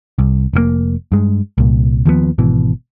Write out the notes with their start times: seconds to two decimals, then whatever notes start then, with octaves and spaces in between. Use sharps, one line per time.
0.18 C2
0.53 F1 G#2 A#3
1.12 G2 G#3
1.58 C2 A#2
2.06 D#2 F3 F#3 B3
2.38 G#1 B2 E3